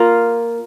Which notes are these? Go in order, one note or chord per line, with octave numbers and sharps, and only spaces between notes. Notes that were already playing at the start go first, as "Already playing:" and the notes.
Already playing: A#3 F4 A#4